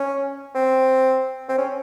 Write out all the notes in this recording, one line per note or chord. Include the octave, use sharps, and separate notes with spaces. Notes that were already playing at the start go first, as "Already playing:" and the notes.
Already playing: C#4
C4
C4
C#4